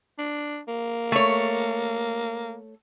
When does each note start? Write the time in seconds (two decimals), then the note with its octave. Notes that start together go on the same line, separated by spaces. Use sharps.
0.19 D4
0.68 A#3
1.12 A3 C#5